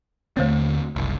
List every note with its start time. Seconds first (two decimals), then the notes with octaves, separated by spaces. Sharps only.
0.37 D#2 D3 A3 C4 C5 C#5
0.96 F#1 C2